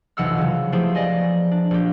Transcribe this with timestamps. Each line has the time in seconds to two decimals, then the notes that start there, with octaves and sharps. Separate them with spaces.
0.17 F1 B1 E3 F#5 E6 F6
0.38 C#3 F#3
0.72 F3 A3 B3 E4 G4 G#4
0.95 D5 D#5 G#5
1.51 D4
1.71 A#1 G4